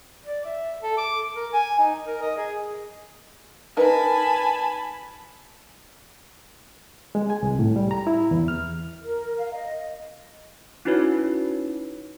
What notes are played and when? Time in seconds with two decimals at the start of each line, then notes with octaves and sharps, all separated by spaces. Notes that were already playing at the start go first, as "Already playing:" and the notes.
0.25 D5
0.45 E5
0.83 A4
0.97 D6
1.35 A#4
1.53 G#5
1.79 D#4
2.05 A#4
2.22 D#5
2.37 G#4
3.77 D#4 A#4 B4 G#5 A5 B5
7.15 G#3
7.30 G#5
7.43 C2
7.59 A2
7.76 G3
7.91 A#5
8.07 E4
8.31 E2
8.48 F6
9.03 A#4
9.37 F5
9.54 D#5
10.85 C#4 D#4 E4 F#4 B4 C#5